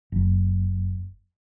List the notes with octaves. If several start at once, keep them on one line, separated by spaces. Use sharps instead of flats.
F#1